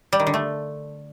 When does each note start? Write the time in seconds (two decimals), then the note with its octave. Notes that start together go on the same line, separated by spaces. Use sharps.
0.13 G3
0.20 D#3
0.27 D3
0.34 A3